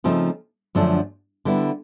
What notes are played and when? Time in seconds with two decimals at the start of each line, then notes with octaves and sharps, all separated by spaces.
0.04 C#3 F3 A3 C4 D#4
0.75 F#2 D3 F3 A3 D4
1.45 D3 G3 B3 E4